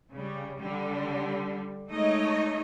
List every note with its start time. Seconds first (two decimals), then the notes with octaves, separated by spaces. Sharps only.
0.11 C#3 G3
0.58 D3 G3
1.88 G#3 A3 D#4 C#5 D#5